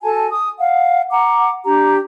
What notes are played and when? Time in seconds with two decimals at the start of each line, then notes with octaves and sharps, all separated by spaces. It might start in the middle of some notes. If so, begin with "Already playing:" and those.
0.02 F#4 A4 G#5 A5
0.30 D#6
0.59 F5 F#5
1.11 F#5 A#5 D6
1.65 D4 G4 A#5